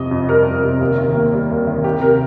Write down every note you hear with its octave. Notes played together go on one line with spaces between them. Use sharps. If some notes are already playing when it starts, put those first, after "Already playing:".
Already playing: F2 C3 D#5
F2
G3 A#4
F2
C3
D#2
D#3
A#3
G3
D#2
D#3
C2 G4
C3 A#4